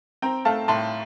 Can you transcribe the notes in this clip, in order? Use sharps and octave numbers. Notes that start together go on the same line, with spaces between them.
C4 G5 A#5
A3 F5 A5
A2 A5 C6